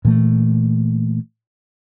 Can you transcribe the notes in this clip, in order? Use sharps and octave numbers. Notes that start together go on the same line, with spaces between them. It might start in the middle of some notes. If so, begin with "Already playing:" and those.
A#2 E3 A3